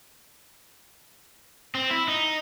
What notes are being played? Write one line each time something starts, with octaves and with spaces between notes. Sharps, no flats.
C4
E4
D#4